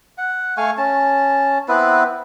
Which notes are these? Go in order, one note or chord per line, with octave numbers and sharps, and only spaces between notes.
F#5
A3 F5 G#5 C#6
C#4 A5
B3 C4 E4 B4